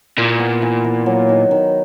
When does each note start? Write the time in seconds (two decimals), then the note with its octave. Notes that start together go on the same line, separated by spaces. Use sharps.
0.17 A#2 E4
0.39 B3
0.62 E3
0.84 E3
1.06 F#3
1.29 D#3
1.51 D#3